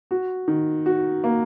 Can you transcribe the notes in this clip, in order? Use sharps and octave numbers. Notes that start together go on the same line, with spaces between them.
F#4
D#3
F#4
A#3